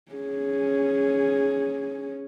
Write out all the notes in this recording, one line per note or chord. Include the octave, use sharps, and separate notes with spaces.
C#4 G#4